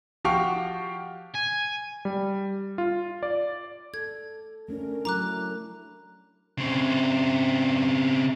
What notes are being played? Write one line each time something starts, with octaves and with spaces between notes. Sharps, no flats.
F3 F#4 G4 F5 G5 C#6
G#5
G3
F4
D5
A4 G#6
A3 C#4 D4 A#4
F#3 E4 A#5 D6 F#6
C#3 C4